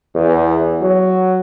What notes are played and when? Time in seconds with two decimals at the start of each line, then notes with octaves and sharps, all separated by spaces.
0.15 E2
0.81 F#3